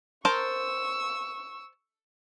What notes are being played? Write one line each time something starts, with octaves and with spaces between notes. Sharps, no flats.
A#4 C5 A5 C#6 E6